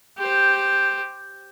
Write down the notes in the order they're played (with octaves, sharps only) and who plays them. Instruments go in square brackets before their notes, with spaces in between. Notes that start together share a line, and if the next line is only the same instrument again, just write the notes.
[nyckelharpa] G4 C5